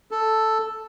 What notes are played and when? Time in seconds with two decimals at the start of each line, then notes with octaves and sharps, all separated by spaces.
0.11 A4